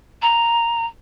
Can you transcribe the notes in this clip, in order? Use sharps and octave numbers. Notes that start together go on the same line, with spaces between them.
A#5